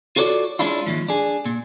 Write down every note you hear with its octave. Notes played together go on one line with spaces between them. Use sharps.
F4 F#4 A4 C#5 D5
G#3 C#4 D4 E4 F4
D#2 G#2 F3
D4 G#4
A#2